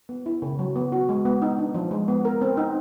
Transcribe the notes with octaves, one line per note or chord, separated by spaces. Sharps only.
B3
E4
C#3
F#3
B3
F#4
G#3
B3
D#4
D4
F3
G#3
B3
A#4
C4
D#4